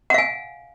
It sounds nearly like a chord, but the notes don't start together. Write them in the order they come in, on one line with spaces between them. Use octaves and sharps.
F#5 F5 G#5